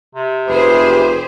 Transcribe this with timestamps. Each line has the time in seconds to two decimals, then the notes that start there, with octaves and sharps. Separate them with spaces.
0.15 C3
0.48 F1 G4 G#4 B4 C5